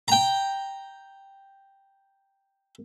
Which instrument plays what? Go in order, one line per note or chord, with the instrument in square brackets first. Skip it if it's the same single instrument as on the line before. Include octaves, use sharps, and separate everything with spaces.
[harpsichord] G5 A#5